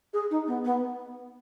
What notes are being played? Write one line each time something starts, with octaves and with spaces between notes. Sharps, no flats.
G#4
D#4
B3
B3